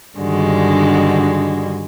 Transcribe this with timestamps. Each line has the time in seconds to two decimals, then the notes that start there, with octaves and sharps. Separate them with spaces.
0.18 G2 D3 D#3 G3 G#3 F#4